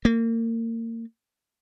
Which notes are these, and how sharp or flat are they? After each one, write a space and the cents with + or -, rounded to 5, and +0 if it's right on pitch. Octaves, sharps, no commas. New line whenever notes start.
A#3 -30